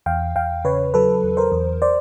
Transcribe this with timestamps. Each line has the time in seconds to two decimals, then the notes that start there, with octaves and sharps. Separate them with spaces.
0.06 E2 F5 G5
0.35 E2 F5 G5
0.64 C#3 B4 C#5
0.94 F#3 A4 B4
1.23 E2
1.37 A#4 C5
1.52 E2
1.82 C5 D5